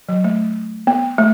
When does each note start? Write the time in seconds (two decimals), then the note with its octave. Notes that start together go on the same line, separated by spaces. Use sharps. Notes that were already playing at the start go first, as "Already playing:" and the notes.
0.09 F#3
0.24 A3
0.87 B3
1.18 A3